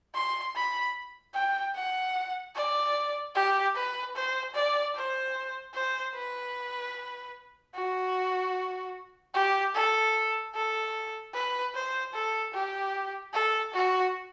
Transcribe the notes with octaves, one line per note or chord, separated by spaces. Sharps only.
C6
B5
G5
F#5
D5
G4
B4
C5
D5
C5
C5
B4
F#4
G4
A4
A4
B4
C5
A4
G4
A4
F#4